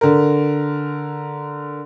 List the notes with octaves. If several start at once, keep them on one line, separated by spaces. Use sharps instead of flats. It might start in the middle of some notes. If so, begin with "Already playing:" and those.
D3 A#4